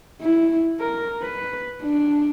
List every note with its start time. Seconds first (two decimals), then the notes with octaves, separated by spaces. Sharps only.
0.21 E4
0.80 A#4
1.21 B4
1.83 D4